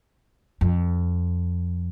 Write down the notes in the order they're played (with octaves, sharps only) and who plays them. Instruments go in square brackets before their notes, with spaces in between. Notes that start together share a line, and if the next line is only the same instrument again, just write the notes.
[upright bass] F2